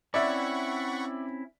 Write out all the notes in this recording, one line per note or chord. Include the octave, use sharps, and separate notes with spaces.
C4 C#4 E4 D5 E5 F#5 B5 C#6